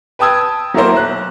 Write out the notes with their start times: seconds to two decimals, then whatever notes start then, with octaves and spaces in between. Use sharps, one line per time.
0.19 B4 G5 A5 D#6 E6 G#6
0.74 F#3 A3 A#3 E4 A#4 C5
0.96 B1 F#6